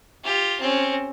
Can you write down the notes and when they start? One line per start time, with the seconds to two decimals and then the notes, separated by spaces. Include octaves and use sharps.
0.24 F4 G4
0.60 C4 C#4